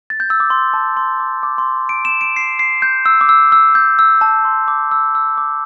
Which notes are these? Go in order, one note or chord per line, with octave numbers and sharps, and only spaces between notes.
A6
G6
E6
D6
C6
A5
C6
D6
D6
C6
D7
E7
D7
C7
C7
G6
E6
D6
E6
E6
G6
E6
A5
C6
D6
E6
E6
D6